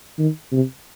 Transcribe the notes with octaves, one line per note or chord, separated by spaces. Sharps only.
D#3
C3